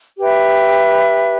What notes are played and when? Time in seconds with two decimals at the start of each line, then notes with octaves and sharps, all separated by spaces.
0.17 G4 B4 E5